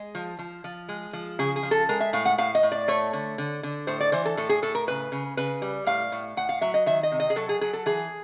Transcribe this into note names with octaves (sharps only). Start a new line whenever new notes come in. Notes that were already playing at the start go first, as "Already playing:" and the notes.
Already playing: G#3
F3
F3
F3
G#3
F3
C#3 G#4
G#4
F3
A4
G#3 A#4
E5
A2 F5
F#5
A2 F5
D#5
A2
D5
A3 C#5
D3
D3
D3
A2 C5
D5
E3 C5
A4
A2 A4
G#4
A2 A4
A#4
C#3 B4
C#3
C#3 B4
G3
A2 F5
A2
A2 F#5
F5
F#3 E5
D#5
D#3 E5
D#5
C3
D#5
G#4
F#3 A4
G#4
F#3 G#4
A4
E3 G#4